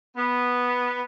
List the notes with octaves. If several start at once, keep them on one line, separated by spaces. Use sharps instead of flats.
B3